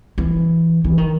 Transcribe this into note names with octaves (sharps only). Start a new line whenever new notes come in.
E3
E3
D#3